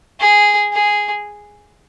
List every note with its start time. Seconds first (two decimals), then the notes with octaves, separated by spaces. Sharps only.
0.20 G#4
0.73 G#4